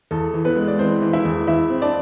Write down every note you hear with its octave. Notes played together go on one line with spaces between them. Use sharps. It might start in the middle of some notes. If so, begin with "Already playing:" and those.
E2 A4
E3
B3 B4
G#3
D5
E3 C4 C5
E3
E4 E5
E2
E2 E4 E5
C4
D4 D5